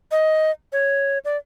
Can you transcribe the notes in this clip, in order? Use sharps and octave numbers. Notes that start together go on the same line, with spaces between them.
D#5
C#5
D5